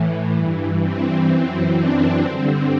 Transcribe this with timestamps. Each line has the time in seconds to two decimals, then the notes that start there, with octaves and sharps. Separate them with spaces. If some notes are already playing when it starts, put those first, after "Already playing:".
Already playing: A2 E3
0.36 G2 E3
0.82 C4
1.29 F#2 E3 C4
1.76 D4
2.23 G2 D3 C4